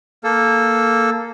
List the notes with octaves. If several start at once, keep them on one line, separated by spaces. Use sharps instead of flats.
A#3 A4